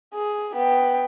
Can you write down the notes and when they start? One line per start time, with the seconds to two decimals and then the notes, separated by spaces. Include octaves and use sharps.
0.14 G#4
0.56 B3 G5